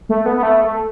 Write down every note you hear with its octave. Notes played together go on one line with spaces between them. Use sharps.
A3
B3
B3
A3
A3